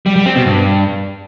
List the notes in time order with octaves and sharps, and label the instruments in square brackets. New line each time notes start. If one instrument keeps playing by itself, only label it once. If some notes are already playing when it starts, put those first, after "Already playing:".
[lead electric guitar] G3
G3
C4
B2
G2